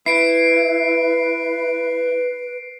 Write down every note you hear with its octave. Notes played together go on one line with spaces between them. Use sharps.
E4 B4 C7 D7